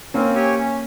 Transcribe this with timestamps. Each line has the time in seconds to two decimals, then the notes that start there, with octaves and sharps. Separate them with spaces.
0.14 A#3 C4 C#4
0.34 G4 C#5 G#5
0.55 C#4